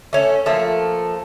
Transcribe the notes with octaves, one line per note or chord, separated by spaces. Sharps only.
A3 C#4
F3 A3 A#3